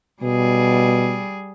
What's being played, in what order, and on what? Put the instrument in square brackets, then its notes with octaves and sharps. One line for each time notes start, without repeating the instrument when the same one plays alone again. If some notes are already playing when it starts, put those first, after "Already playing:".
[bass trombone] B2 [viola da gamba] G3 G#4